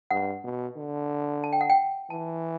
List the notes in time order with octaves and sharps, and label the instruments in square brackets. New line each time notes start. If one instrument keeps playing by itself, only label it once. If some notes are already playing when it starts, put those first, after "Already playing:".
[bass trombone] G2 [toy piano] F#5
[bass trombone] B2
D3
[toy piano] A5
G5
F#5
G5
[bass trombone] E3 [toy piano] A5